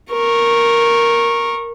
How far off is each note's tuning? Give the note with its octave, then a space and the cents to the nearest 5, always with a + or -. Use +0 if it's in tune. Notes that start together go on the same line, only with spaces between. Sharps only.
A#4 +0 C#6 -20